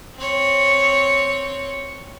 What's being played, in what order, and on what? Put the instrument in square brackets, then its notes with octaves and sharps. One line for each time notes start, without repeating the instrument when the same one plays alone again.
[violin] C4 C#5